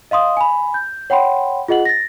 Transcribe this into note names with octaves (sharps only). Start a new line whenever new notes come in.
D#5 F5 C6 D#6
G#5 B5
G6
C#5 F#5 G5 B5 C6
F4 G#4 D#5 F#5 F#7
A6 A#6